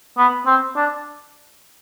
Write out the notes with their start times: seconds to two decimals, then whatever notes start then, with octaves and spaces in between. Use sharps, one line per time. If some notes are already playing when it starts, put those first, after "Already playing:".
0.17 B3
0.46 C4
0.76 D4